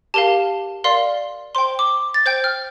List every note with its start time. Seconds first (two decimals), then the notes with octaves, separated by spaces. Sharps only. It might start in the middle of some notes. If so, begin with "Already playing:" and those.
0.14 G4 A#4 F5 A5
0.84 A#4 D5 F5 C6
1.55 C5 G5 C6
1.79 D6
2.14 A6
2.26 C5 G5 G6
2.44 F6